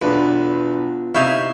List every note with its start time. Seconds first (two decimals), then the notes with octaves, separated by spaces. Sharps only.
0.02 B1 E2 B3 D4 F4 B4
1.15 C3 D#4 E4 E5 F5 C6 C#6 G6